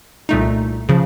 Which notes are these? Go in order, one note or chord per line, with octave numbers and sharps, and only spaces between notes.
C2 A#2 A3 D#4
C#3 F3